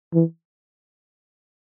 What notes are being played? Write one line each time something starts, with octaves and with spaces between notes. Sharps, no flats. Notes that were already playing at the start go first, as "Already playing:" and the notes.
E3